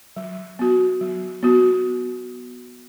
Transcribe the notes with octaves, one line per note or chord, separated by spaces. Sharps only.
F#3
B3 F#4
F#3
B3 F#4